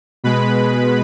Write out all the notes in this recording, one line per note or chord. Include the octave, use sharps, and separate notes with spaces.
B2 G#3 B4 B5